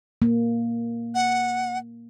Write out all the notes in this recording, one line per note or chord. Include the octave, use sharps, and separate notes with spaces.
A#3
F#5